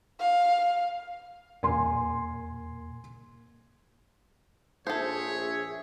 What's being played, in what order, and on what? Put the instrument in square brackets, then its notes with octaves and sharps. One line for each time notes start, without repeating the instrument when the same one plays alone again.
[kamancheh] F5
[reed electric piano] E2 A#2 A#3 [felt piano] G#5 C6
[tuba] A#1 [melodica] G#4 E5 [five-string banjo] A4 C5 [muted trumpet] C#5